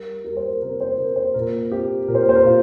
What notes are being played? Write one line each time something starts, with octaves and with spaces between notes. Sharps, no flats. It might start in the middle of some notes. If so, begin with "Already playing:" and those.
Already playing: G3 A#4
G3 A#4
C5
A#4
C3 A#4
C5
C3 A#4
C5
A#2 A#4
C4 G4
A#2 A#4
C5
A#4
C5
A#4
A#2 F4